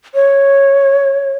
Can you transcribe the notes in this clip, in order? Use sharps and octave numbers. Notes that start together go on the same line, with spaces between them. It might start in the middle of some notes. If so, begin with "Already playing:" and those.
C#5